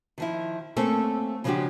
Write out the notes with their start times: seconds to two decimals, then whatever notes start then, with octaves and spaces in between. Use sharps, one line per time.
0.18 D#3 F3 E4
0.77 A3 A#3 C4 C#4 A4
1.44 C#3 F3 G#3 D4 F#4 G4